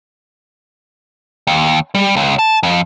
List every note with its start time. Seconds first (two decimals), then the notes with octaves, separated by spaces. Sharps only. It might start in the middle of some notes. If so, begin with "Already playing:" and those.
1.47 D#2
1.95 G3
2.16 C#2
2.39 A5
2.63 F2